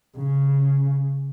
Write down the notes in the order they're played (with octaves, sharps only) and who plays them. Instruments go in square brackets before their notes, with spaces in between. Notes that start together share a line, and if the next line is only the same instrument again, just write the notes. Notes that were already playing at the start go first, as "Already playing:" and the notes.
[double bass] C#3